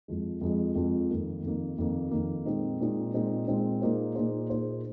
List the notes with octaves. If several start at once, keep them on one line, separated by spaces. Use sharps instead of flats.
F2 F3 G#3
F2 F3 G#3
F2 F3 G#3
F2 D#3 A#3
F2 D#3 A#3
F2 D#3 A#3
F2 D#3 A#3
A#2 G#3 C4 D#4
A#2 G#3 C4 D#4
A#2 G#3 C4 D#4
A#2 G#3 C4 D#4
A#2 A#3 D#4 G#4 C5
A#2 A#3 D#4 G#4 C5
A#2 A#3 D#4 G#4 C5